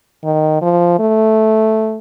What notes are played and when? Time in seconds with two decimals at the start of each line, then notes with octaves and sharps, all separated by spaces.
0.24 D#3
0.62 F3
0.99 A3